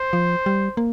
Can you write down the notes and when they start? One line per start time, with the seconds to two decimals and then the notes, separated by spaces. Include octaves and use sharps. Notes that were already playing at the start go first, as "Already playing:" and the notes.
Already playing: C5
0.13 F3
0.46 G3
0.77 A#3